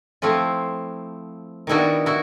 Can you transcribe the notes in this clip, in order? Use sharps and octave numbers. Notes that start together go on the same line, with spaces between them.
F3 A3 C4 E4 F4
D#3 G3 B3 D4 E4 F#4
E4 F#4